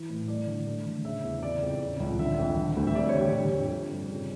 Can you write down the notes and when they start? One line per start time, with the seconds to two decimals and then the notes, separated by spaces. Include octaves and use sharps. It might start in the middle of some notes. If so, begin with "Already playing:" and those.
Already playing: E3
0.09 A2
0.28 A3 D5
0.47 D3
0.66 A3
0.86 D3
1.05 C#3 E5
1.23 E2
1.42 C#3 D5
1.62 F2
1.80 C#3
2.00 C#2
2.19 D3 E5
2.38 F2
2.57 D3
2.77 D2
2.87 E5
2.95 G3 D5
3.09 C#5
3.15 D3
3.21 G4
3.34 D3
3.53 F2
3.72 F3
3.91 G2
4.09 C#3